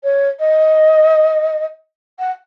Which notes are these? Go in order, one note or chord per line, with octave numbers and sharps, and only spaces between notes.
C#5
D#5
F#5